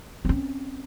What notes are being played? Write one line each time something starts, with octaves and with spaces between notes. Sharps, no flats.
C4 C#4